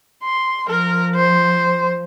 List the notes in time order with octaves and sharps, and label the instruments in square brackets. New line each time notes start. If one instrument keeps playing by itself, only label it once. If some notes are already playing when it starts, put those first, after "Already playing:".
[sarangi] C6
[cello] F3 [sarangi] A#4
[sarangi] C5